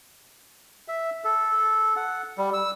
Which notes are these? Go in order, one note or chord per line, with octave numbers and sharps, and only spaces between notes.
E5
A4
F#5
G3
E6